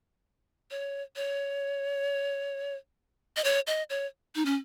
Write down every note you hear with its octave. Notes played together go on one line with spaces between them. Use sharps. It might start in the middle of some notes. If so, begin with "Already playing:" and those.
C#5
C#5
D#5
C#5
D#5
C#5
D#4
C#4